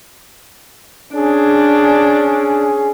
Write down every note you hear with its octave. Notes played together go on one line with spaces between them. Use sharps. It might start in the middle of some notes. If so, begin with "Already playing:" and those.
C#4 D4 G#4